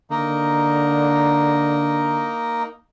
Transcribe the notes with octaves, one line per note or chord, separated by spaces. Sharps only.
D3 A#3 D#4